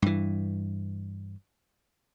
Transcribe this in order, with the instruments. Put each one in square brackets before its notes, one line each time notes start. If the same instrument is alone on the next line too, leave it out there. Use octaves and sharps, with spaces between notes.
[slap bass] G2 E3